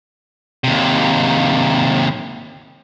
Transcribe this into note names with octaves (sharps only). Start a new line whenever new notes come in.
D#2 C3